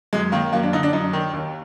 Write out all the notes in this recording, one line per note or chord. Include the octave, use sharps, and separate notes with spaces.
F#2 G#3
D#3 A#3
F#2 A#3
D4
D3 D#4
D4
F#2 D#4
D#3
D#2